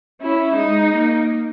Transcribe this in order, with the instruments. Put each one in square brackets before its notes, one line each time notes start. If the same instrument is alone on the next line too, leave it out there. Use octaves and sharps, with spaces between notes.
[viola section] C#4 [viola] E4
[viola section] G#3 [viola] D#4
[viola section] A#3